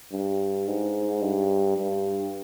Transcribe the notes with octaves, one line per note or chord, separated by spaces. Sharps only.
G2
G#2
G2
G2